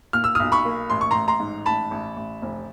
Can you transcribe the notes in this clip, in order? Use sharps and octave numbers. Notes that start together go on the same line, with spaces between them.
A#2 F6
E6
B1 D#6 F6
B5 C#6
A#3
A1 C6
C#6
A1 A#5 C6
A#5 C6
G#2
A1 A5 B5
A1
A1
F1